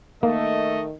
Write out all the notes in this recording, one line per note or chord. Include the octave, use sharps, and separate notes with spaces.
D#3 A3 A#3 D#5